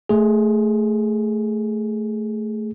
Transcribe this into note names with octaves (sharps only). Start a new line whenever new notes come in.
A3 G#4